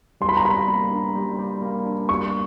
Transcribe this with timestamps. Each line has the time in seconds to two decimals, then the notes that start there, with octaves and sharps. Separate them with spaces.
0.21 G3 C6
0.29 B5
0.37 A#5
0.44 G3 B5
0.68 A#3
0.91 D4
1.15 G3
1.39 G3
1.62 A#3
1.86 D4
2.09 G3 C#6